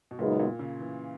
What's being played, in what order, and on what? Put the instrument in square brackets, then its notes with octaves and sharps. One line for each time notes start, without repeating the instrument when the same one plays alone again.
[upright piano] B2
[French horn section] F#2 C#3 G#3 B3 D#4 [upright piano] A#2
[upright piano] A#2
C#3
E3